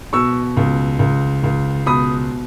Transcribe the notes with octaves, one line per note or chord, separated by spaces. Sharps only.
B2 C#6 E6
C#2
C#2
C#2
B2 B5 D#6